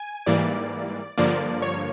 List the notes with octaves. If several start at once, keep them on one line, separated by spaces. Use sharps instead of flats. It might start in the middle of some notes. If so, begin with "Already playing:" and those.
Already playing: G#5
G#2 E3 G3 A#3 D5
G2 D3 F3 A#3 D5
C#5